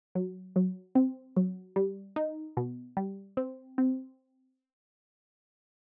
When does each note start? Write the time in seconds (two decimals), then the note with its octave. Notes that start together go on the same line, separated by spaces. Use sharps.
0.15 F#3
0.56 F#3
0.95 C4
1.37 F#3
1.76 G3
2.16 D#4
2.57 B2
2.97 G3
3.37 C4
3.78 C4